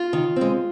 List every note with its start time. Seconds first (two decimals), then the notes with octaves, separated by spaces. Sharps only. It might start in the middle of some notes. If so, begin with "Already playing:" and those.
Already playing: F4
0.13 D#3
0.36 G#3 C4